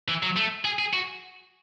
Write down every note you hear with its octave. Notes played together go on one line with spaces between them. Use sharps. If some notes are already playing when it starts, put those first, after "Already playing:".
E3
F#3
A3
G#4
G#4
F#4